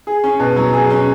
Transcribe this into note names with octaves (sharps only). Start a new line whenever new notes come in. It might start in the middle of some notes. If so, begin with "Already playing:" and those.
G#4
C#4
B2
F#3
G#4
C#4